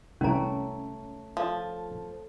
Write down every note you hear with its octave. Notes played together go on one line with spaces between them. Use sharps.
C2 E3 A3 C#4 C#5 A#5 D7
F3 A4